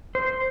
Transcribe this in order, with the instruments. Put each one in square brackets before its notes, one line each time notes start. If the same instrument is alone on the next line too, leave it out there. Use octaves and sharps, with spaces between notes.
[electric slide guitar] C5